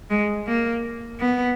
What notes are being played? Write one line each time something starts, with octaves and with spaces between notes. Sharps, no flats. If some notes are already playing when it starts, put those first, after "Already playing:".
G#3
A#3
B3